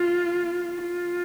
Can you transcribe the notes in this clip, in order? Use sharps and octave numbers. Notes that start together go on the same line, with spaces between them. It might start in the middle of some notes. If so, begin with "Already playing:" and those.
Already playing: F4
F4